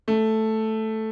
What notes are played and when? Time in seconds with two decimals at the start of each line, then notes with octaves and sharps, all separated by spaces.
0.08 A3